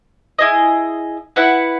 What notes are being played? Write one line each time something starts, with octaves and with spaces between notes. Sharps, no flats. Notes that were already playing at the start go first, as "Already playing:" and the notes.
E4 G#4 D#5
E4 B4 F#5